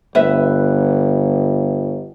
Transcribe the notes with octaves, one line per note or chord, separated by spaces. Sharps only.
G1 B4 E5